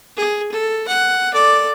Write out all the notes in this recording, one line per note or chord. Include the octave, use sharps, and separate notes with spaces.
G#4
A4
F#5
A4 D5